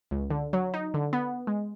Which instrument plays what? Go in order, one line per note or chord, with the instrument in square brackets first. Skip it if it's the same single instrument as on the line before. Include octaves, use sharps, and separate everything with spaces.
[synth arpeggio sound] C#2
D3
F#3
D#4
D3
B3
G#3